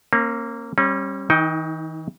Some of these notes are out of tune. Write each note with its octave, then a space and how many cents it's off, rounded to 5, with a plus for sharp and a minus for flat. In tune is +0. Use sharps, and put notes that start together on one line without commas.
A#3 -10 C#4 -45
G3 +0 C#4 -35
E3 -45 D#4 +15 G5 +0